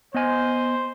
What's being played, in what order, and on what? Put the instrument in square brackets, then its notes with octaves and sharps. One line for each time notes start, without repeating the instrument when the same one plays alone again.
[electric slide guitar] B3 D#5 G#5 [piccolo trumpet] C5